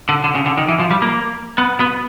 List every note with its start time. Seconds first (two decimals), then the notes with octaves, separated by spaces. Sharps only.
0.09 D3
0.24 D3
0.35 C#3
0.46 D3
0.57 D#3
0.68 E3
0.79 F3
0.91 G3
1.02 A#3
1.58 B3
1.80 B3